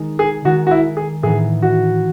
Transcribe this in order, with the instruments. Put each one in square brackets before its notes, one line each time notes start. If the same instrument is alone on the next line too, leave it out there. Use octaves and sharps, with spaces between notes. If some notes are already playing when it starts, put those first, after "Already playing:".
Already playing: [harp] D#3 G#3 D#4
[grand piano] G#4
[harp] D#3 G#3 D#4 [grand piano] F#4
[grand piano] F#4
E4
G#4
[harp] A2 E3 B3 D#4 [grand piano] G#4
[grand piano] F#4